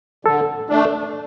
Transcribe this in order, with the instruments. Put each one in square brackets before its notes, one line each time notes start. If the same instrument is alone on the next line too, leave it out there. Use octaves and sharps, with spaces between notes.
[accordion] D3 [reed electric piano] A4
[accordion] A3 D4